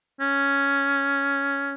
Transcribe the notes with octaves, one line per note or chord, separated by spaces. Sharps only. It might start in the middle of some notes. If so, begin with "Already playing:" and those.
C#4